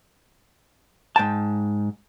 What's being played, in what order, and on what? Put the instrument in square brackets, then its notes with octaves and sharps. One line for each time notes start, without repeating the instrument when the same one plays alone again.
[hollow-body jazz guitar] G#2 G5 A5